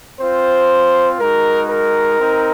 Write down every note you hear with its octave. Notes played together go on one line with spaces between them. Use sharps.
C4 F4 C5
G#3 D#4 F#4 A#4
A#4
C4 D#4